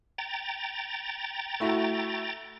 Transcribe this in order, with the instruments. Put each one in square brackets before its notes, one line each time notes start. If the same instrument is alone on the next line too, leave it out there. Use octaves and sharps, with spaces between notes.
[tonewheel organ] G5 A#5 A6
[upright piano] A3 E4 F#4